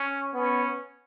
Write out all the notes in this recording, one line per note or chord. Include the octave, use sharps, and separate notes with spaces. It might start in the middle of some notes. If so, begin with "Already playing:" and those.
Already playing: C#4
B3 C#4